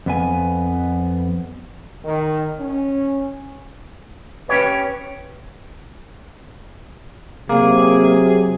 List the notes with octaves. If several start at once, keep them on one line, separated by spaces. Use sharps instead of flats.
F2 B3 G#5
D#3
C#4
C#4 G4 B4 C#5
C3 F#3 A#3 G#4